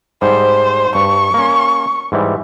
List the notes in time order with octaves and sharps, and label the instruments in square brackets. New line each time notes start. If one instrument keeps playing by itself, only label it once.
[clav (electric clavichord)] G#2 G3 [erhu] C5
[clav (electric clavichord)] G2 [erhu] C#6
[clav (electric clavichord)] A#3 C#4
G#2 E3 G3